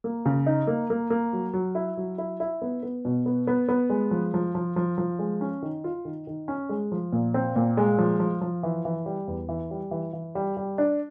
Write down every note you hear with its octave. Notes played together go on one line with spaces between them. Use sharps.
A#3
C#3
D#4
A#3
A#3
A#3
F#3
F#3
E4
F#3
E4
E4
B3
B3
B2
B3
B3
B3
G#3
F3
F3
F3
F3
F3
G#3
C#4
D#3
F4
D#3
D#3
C#4
G#3
F3
A#2
C4
A#2
G#3
F3
F3
F3
E3
E3
G3
E2
E3
G3
E3
E3
G3
G3
D4